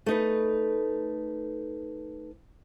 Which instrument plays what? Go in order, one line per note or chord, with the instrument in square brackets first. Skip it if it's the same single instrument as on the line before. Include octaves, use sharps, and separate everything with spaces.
[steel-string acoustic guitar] A3 D#4 B4